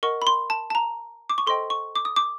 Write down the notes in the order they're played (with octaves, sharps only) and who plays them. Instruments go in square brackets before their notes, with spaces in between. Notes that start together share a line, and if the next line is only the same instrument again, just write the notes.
[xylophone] A#4 D#5 F#5 C#6
B5
C6
A5
A5
A#5
D6
C#6
A4 C5 D#5 G5 C6
C#6
D6
D#6
D6